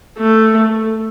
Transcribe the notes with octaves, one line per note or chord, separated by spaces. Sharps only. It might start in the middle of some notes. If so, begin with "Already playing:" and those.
A3